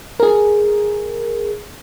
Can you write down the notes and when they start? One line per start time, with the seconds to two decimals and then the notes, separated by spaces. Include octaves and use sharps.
0.20 G#4 A#4